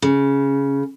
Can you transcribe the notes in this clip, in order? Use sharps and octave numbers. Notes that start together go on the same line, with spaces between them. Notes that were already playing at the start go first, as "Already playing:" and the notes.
C#3